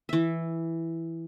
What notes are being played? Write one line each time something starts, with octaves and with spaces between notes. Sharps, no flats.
E3 E5